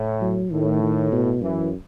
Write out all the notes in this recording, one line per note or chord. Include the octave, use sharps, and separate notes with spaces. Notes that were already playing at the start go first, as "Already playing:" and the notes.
Already playing: A2
F#3
A2 D#3
D#3
B2
F#2 E3